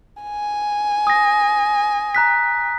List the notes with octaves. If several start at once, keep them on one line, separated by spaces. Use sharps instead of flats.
G#5
D#6 A#6
A#5 F#6 B6